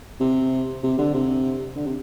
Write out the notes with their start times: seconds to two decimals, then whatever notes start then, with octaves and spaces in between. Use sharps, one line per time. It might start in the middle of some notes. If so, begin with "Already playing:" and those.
0.20 C3
0.83 C3
0.98 D3
1.14 C3
1.76 D3
1.86 C3